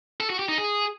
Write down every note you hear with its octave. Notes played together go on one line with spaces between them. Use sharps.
A4
F#4
G4
D#4
G#4